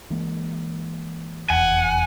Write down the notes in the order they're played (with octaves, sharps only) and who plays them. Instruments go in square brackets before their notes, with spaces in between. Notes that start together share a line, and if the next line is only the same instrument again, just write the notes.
[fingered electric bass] E3 G#3 A#3
[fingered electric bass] F1 E2 [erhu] F#5 [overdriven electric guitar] G#5